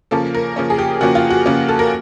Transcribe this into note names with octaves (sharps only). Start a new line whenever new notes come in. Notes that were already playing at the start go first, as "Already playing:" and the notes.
C#3 F3 A#3 C#4 A4
A#4
C#3 F3 A#3 C#4
G#4
G4
C#3 F3 A#3 C#4 F#4
F4
F#4
C#3 F3 A#3 C#4
A4
A#4